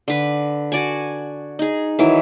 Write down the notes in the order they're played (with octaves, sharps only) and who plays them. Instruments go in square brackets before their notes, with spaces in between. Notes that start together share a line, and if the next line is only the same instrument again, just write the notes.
[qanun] D3 B4
F#4 D5 G#5
D#4 G#4
D#3 E3 F#3